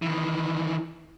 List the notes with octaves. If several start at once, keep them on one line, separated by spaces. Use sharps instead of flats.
D#3 E3